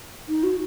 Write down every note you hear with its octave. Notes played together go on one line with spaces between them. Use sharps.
D#4
F#4